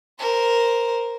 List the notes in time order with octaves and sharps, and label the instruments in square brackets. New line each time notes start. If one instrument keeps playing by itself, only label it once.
[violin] A#4 C5